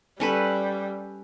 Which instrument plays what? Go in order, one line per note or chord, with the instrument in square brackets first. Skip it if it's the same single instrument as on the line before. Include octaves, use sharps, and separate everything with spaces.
[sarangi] G3 [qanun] C#4 A4 B4